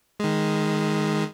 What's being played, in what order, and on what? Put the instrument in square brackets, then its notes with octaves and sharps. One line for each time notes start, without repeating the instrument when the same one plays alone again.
[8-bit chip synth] D#3 G#3